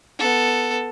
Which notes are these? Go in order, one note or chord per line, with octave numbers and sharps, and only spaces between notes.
B3 A4